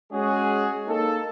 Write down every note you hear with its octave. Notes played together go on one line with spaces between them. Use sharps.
G#3 C#4 F#4 G#4
A#3 D#4 A4